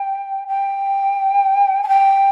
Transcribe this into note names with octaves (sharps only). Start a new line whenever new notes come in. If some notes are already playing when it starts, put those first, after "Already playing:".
Already playing: G5
G5
G#5
G5